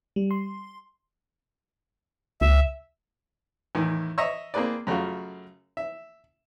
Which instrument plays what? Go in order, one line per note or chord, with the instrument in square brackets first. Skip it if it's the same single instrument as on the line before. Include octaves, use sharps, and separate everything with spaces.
[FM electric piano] G3
C6
[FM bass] C#2 [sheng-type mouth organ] E5
[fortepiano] E2 A2 D#3 E3
D#5 E5 A#5 C#6 E6
A#3 C4 G#4 B4 D5
F#2 C#3 A3 F4 F#4
E5